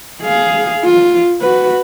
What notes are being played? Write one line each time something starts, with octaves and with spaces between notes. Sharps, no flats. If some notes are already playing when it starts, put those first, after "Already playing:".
G#4 F5
F4
F#4 B4